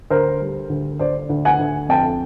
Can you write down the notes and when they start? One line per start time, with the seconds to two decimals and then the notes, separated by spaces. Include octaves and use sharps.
0.10 D2 A#4 C5
0.41 G3
0.70 D2
0.99 D2 C5 D5
1.29 D2
1.45 F#5 G#5
1.59 D2
1.89 F2 G5 A5